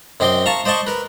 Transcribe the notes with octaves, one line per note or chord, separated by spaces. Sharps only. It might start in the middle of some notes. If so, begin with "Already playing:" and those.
F#2 C4 D#5 C6 D6
F5 A5 A#5 C#6
C5 D5 D#5 A5 C#6
A#4 B4